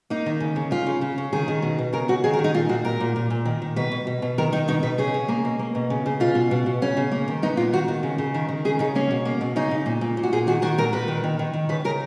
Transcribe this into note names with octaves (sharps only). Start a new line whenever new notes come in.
A#3 D#4
D#3
C#3
C#3
C#3 F4
C#3
C#3
C#3
D#3 G#4
D#3
B2
B2
C#3 A#4
C#3 F#4
D#3 G#4
A#4
D#3
D#4
A#2 F4
A#2 F#4
A#2 A#4
A#2
A#2
A#2
D#3
D#3
B2 B4
B2
B2
B2
D#3 A#4
D#3 D#4
B2 D#4
B2 B4
C#3 G#4
C#3
A#3
B2
A#3
B2
C#3
C#3
B2 F4
B2
B2
B2
C#3 C#4
C#3
A#3
D#3
B3 D#4
A#2 F4
D#3 F#4
D#3
C#3
C#3
D#3
D#3
C#3 G#4
C#3 D#4
A#3 C#4
B2
A#3
B2
C#3 D#4
C#3
A#2
A#2
A#2
F#4
A#2 G#4
D#3 F#4
D#3 F#4
A#2 A#4
A#2 B4
D#3
D#3
D#3
D#3
C#3 B4
C#3 A#4